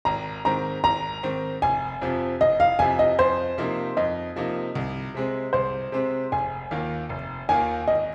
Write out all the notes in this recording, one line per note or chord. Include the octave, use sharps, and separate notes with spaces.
G#1 A#5
G#2 D#3 C4 A#5
G#1 A#5
G#2 D#3 C4
F1 G#5
F2 C3 F3
F1 D#5
F5
F2 C3 F3 G#5
D#5
F2 C5
C3 F3 A#3 D#4
F2 D#5
C3 F3 A#3 D#4
C2
C3 G#3 C4
C2 C5
C3 G#3 C4
F1 G#5
D#2 D#3 A#3 F4
F1
D#2 D#3 A#3 F4 G#5
G#1 D#5